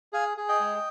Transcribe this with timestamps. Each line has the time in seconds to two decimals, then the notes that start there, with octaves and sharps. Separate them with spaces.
0.13 G#4 F5 G#5
0.37 G#4
0.48 D#5 G5
0.60 G#3